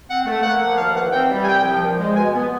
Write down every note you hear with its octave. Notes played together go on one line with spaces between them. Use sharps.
C4 F#5
A3
A#3 F#5
F3
D#2 F5
E3 F#5
C4 G5
G3
G#5
C2 G5
F3
A#2
G#3
B2 G#5
B3